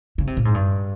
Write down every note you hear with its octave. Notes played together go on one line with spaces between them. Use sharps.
C#3
C3
A#2
G#2
G2